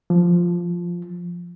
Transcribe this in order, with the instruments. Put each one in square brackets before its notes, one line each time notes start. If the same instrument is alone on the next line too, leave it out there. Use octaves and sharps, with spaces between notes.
[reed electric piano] F3